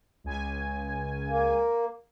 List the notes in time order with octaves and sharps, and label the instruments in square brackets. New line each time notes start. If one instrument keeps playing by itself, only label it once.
[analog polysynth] C#2 G#5
[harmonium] A#3